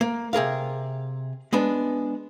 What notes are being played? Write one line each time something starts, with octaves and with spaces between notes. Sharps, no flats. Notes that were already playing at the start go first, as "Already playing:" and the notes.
A#3
C3 G#4 A#4 F5
G#3 B3 D4